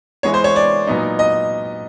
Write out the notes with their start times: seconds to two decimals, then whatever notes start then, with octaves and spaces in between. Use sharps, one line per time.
0.23 E3 G#3 B3 C#5
0.34 C5
0.44 C#5
0.56 D5
0.87 A#2 F#3 B3 D#4
1.19 D#5